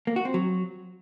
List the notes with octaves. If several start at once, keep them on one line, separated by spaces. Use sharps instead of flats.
A#3
F#4
C4
F#3